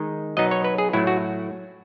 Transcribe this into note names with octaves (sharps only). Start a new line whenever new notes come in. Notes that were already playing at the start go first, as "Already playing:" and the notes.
Already playing: D#3 G#3 D#4
B2 F#3 B3 D#4 D#5
C#5
B4
G#4
A2 F#3 A3 E4
F#4